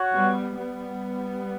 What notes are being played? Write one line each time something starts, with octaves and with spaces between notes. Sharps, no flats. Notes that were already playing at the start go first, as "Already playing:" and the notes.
Already playing: F#4 C#5 F#5
G3 B3
G3 B3